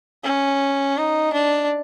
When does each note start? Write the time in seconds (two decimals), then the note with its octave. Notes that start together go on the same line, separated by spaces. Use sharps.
0.24 C#4
0.97 D#4
1.33 D4